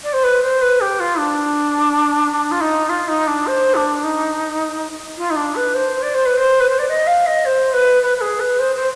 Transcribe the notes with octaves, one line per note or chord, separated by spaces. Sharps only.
D5
C5
B4
C5
B4
G4
F4
D4
D4
F4
D#4
F4
D#4
D4
C5
D4
D#4
F4
D#4
D4
B4
C5
D5
C5
B4
C5
B4
C5
D5
D#5
F5
D#5
C5
B4
B4
B4
G#4
B4
C5
C5